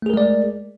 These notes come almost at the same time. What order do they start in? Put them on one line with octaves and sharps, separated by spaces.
A3 G#4 A#4 G#3 D5